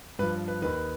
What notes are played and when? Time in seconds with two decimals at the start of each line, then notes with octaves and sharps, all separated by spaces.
0.19 G2 F3 B4
0.48 B4
0.62 D#2 D#3 B4